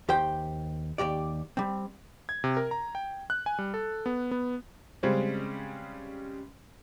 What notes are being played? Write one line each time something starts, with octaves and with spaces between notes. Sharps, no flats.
D#2 G4 C5 G5
D#2 A#2 G4 D5
G3 C4
G#6
C3
A#4
A#5
G5
F#6
G#5
G3
A4
B3
B3
C#3 G3 G#3 C4 C#4